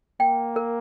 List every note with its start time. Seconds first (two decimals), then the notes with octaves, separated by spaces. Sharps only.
0.20 A#3 G5
0.56 A#4